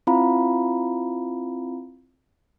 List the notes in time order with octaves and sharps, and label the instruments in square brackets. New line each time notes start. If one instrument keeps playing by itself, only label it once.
[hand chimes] C4 E4 F4 F5 A#5 B5